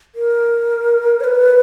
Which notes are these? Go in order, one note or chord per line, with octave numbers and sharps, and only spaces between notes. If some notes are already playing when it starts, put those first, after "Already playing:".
A#4
C#5
B4